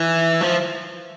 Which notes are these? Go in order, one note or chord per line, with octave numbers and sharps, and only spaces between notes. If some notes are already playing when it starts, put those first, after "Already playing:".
Already playing: E3
F3